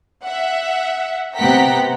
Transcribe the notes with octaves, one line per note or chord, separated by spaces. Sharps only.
E5 F#5
C3 B3 F#5 G5 A#5 B6